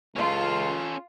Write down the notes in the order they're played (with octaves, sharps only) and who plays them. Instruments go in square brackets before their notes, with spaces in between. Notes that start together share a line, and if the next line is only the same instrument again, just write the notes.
[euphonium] C#2 [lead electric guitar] C#4 A4 [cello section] F4